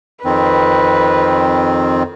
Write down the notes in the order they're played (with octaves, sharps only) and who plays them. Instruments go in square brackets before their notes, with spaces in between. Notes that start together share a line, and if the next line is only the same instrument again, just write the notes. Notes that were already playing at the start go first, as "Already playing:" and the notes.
[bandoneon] F2 D#3 C4 [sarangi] B4